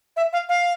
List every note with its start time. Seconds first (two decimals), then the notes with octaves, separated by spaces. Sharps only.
0.17 E5
0.33 F5
0.49 F5